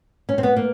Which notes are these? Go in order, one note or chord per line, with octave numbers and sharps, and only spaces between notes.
C#4
C4
B3
A#3